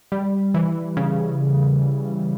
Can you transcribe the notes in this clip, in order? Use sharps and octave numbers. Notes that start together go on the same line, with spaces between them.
G3
E3
C#3